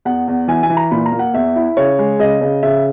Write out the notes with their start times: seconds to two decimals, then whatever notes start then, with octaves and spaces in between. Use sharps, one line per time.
0.05 E2 F#5
0.28 E2
0.48 E3 G#5
0.63 G#5
0.70 E3
0.77 A#5
0.91 A#2 B5
1.06 A#5
1.12 A#3
1.19 F#5
1.34 E2 E5
1.56 E4
1.77 C#3 C#5
1.99 G#3
2.19 C#3 D#5
2.41 C#3
2.63 C#3 E5